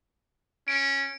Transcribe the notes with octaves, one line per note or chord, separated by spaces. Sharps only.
C#4 D7